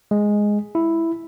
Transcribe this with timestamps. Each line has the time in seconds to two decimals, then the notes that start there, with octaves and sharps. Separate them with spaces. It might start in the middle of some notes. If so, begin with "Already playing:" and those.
0.11 G#3
0.75 E4